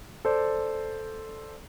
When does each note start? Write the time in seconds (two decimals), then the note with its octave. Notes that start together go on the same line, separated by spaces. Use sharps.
0.25 A4 C5 D5